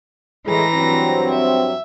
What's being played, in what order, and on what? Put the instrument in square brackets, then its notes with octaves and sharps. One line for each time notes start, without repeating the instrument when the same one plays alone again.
[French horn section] A2 G#3 G#4 [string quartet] E3 A#5 A#6
[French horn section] G2 F#3 C4
[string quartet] E5